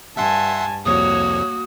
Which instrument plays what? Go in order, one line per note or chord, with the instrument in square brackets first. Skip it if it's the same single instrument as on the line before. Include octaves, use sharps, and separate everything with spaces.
[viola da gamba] G2 [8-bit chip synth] E5 F#5 C6 [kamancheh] G#5 A5
[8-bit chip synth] C2 F2 [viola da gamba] A#3 F#4 [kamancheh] C#5 [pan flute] D#6